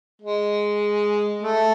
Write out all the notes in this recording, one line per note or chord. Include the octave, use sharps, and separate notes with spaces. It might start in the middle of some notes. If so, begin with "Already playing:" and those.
G#3
A3